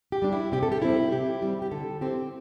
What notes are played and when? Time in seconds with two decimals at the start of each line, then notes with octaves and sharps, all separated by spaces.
0.12 G4
0.22 G3 D4
0.33 E4
0.52 C3 G4
0.63 A4
0.72 G4
0.82 G3 C4 E4
1.12 C3 G4
1.42 G3 C4
1.62 G4
1.71 D3 A4
2.01 C4 E4 G4